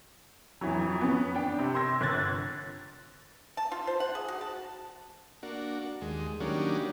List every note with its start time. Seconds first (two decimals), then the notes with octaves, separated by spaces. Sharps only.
0.61 F2 E3 F#3
1.01 B3 C#4
1.35 D4 G5
1.59 C3
1.75 C6 E6 G#6 A#6
2.01 G1 F#6 G#6 A6
3.57 A5
3.72 F4
3.87 C5
4.00 F#5
4.15 G#4
4.28 F#4
4.41 A5
5.43 A#3 D4 F#4
6.01 D#2 G#3
6.40 D#3 F#3 G3 A#3 C#4 D4